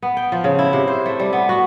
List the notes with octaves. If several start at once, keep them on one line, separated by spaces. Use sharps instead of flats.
B3
G5
F3
C#3
E4
C3
C5
A3
G3
B3
F#4